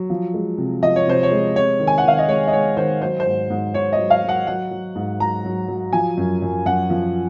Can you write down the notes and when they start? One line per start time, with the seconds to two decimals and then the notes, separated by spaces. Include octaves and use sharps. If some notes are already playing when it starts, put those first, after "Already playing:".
Already playing: F#3
0.10 F3
0.34 G#3
0.58 C3
0.83 F3 D#5
0.96 C#5
1.07 C3 C5
1.23 C#5
1.32 G#3
1.56 C3 C#5
1.79 D#3
1.87 G#5
1.98 F#5
2.04 D#3 F5
2.19 D#5
2.28 G#3 C#5
2.48 D#5
2.53 G#3 C#5
2.77 D#3 C5
3.02 F#3 C5
3.20 C5
3.26 G#2
3.50 G#2
3.74 G#2 C#5
3.93 D#5
3.98 F#3
4.10 F5
4.23 F#3
4.29 F#5
4.47 F#3 F#5
4.71 F#3
4.95 G#2
5.20 F#3 A#5
5.45 F#3
5.68 F#3
5.93 F3 G#5
6.17 F#2
6.42 F#2
6.66 F#2 F#5
6.90 F3